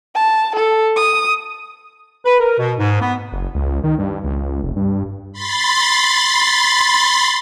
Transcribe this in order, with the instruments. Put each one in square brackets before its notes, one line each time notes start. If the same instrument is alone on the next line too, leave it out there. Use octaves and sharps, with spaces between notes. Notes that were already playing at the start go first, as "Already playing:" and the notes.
[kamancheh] A5
A4
D#6
[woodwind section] B4
A#4
B2
G#2
B3
[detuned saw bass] F#1
C#2
D#3
G2
C#2
F1
G2
[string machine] B5 C6 A6